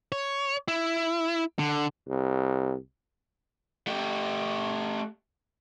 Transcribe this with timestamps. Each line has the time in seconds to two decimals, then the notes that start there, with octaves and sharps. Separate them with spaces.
0.12 C#5
0.68 E4
1.59 D3
2.08 C2
3.87 A3 G4